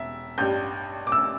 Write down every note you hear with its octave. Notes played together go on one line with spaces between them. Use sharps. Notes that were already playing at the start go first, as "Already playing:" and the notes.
Already playing: E1 E5
A1 G2 G3 G6
D6
E6